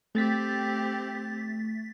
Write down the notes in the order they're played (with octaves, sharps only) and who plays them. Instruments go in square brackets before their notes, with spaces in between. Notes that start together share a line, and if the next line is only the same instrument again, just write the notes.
[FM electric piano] A3 A6 B6 [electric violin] C4 G4